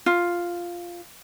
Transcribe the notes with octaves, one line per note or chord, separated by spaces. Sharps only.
F4